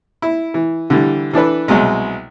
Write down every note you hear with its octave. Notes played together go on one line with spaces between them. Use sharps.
E4
E3
D3 E3 G3
E3 D4 A4 B4
C2 B2 F#3 G#3